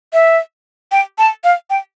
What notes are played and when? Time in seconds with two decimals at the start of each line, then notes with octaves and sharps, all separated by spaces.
0.13 E5
0.92 G5
1.18 A5
1.44 F5
1.70 G5